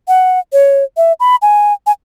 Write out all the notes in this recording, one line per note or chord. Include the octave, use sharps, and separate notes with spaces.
F#5
C#5
E5
B5
G#5
G#5